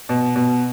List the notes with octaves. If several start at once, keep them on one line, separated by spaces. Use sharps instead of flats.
B2
B2